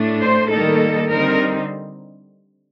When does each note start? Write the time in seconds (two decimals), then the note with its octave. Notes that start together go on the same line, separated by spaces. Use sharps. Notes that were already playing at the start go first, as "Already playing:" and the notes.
Already playing: A2 A3 D4
0.20 C5
0.50 D#3 G3 A#3 D#4 A4
1.10 D3 G3 C4 D#4 A#4